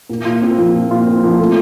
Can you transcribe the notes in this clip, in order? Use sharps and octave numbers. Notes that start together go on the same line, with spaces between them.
A#2
F4
C4
F3
A#2
F4
C4
F3
A3